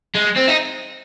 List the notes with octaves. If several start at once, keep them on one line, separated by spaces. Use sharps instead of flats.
G#3
C4
D#4